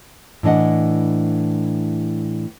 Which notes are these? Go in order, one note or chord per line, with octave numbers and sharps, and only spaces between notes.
A2 E3 D4 D#5 F#5